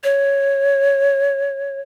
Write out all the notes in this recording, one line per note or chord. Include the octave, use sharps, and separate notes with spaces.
C#5